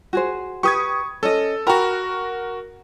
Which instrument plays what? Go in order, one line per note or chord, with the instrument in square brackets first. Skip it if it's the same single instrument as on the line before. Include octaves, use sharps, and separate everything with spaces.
[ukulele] F#4 G#4 C5
[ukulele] G4 B4 [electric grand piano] C#6 D#6 G#6
[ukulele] C#4 D#5 [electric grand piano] A4
[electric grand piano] F#4 A#4 [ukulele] G5 A#5 B5